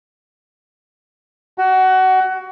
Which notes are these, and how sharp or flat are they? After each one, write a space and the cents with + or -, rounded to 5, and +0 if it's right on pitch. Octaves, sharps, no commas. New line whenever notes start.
F#4 +20